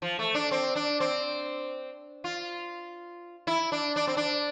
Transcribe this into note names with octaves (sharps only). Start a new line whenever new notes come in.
F3
A3
D4
C4
D4
C4
F4
E4
D4
D4
C4
D4